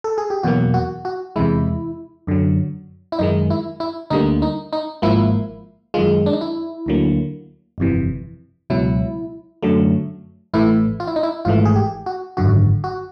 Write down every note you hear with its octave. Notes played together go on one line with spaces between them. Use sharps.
A4
G#4
G4
E2 B2 F#3 A#3 F#4
F#4
F#4
E2 C3 E3 G#3 E4
F#2 D3 F#3
E4
F#2 D#3 G#3 D#4
E4
E4
D2 D3 G3 A#3 D#4
D#4
D#4
G#1 G#2 F3 A#3 E4
F#2 D#3 G#3 F4
D4
D#4
E4
D2 D3 F#3 A#3
G1 F2 C3 E3
C#2 B2 F#3 E4
F#2 D3 F#3 A3
A1 A2 E3 A3 E4
F4
E4
D#4
E4
G#1 G#2 E3 A3 F4
G#4
G4
F#4
G#1 F#2 D3 F#4
F#4